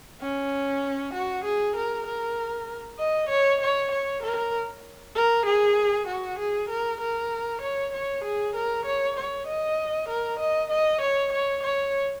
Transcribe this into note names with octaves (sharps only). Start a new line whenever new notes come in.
C#4
F#4
G#4
A#4
A#4
D#5
C#5
C#5
C#5
A#4
A#4
G#4
F#4
G#4
A#4
A#4
C#5
C#5
G#4
A#4
C#5
C#5
D#5
A#4
D#5
D#5
C#5
C#5
C#5